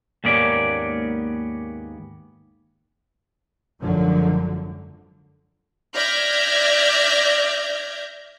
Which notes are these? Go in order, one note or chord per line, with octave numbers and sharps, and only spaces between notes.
D#2 G#2 A#3 B3 C#4 D5
G#1 F#2 D3 F3 F#3
D5 E5 F6 G6 G#6 A#6